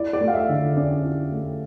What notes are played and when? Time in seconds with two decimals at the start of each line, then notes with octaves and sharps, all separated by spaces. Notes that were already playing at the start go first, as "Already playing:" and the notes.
Already playing: E4 D5
0.13 D5
0.21 A3
0.28 F5
0.34 E5
0.49 D3
0.76 C#4 D5
1.03 E4
1.32 A3